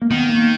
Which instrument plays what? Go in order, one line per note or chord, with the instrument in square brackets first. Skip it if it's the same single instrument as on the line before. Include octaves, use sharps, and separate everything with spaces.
[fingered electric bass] A#3
[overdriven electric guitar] D#3 [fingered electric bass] B3
[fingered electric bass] A#3